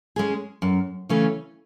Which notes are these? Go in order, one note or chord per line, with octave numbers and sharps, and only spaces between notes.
G#3 C#4 G#4
F#2
C#3 E3 A3 C#4